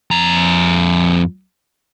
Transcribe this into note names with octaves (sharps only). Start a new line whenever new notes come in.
F2 A#5